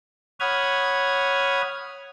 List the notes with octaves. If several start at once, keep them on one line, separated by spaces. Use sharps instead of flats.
C#5 F#5 B5 D#6 F6 G#6